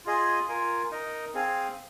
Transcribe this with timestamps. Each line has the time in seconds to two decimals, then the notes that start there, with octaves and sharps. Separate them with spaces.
0.05 F4 G#4 D#5 G#5
0.48 F4 A#4 G#5
0.91 D#4 A#4 D#5
1.34 C4 G#4 F5 G#5